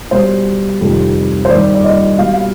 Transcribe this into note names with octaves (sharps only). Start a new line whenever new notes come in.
B2 G3 C5
F2 C3 D#3 G3
C5
G2 D#3 G3 D5
D5
D#5
B2 G3 F5
F5